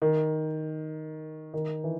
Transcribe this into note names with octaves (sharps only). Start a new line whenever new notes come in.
D#3
D#3
E3